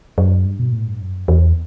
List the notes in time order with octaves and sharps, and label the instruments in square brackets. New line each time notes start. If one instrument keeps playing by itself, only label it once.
[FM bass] F#2
G2
B2
A2
G2
F#2
E2